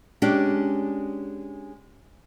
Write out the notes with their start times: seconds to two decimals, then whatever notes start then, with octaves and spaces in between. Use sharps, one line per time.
0.22 G#3 C#4 D4 G4